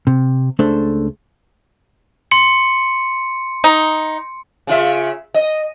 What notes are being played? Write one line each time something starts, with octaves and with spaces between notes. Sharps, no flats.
C3
C#2 A3 D4 A4 C5
C6 C#7
D#4
C#3 F4 E5
D#5